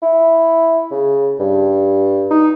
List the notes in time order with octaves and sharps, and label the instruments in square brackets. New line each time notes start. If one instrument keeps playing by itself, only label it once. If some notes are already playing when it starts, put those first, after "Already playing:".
[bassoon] E4
C#3
G2
D#4